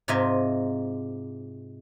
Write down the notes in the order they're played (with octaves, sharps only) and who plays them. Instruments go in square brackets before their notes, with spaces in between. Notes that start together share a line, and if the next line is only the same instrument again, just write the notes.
[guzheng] G#2 C3 F4 D#5 E5 G#5